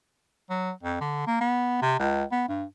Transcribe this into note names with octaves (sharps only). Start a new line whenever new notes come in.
F#3
F2
D3
A#3
B3
C3
C#2
B3
G2